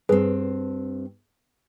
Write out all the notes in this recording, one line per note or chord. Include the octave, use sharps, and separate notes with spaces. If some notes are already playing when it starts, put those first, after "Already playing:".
G2 C4 G#4 B4